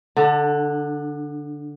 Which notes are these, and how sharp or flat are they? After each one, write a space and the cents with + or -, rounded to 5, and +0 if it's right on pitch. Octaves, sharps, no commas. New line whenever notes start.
D3 +0 D4 +40